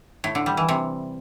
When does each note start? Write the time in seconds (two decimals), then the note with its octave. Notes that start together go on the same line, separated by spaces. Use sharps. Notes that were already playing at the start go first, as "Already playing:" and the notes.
0.24 A2
0.35 D3
0.46 G3
0.57 E3
0.68 C3